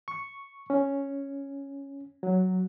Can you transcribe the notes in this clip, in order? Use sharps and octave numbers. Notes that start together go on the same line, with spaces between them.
C#6
C#4
F#3